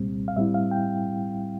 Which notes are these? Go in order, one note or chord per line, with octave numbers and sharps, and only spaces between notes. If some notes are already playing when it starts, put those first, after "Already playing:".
Already playing: C2 A#2 G3 C4
F5
A2 G3 C4 E4 E5
F5
G5